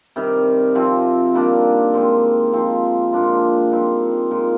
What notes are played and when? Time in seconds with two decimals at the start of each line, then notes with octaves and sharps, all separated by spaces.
0.16 C3 D#3 G3
0.75 C3 F3 C4
1.34 D#3 G3 A#3 D4
1.94 D#3 G#3 C4
2.53 F3 C4 D#4
3.12 A#2 G#3 D4 F4
3.71 A#2 G3 C4 D#4
4.31 A#2 G#3 D#4